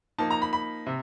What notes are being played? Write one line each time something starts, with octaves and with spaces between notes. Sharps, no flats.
F3 A#3 D#4 A5
A#5
B5
B5
C3